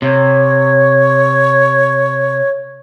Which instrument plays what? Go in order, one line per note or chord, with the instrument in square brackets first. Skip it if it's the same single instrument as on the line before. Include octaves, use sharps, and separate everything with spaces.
[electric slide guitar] C3 [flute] C#5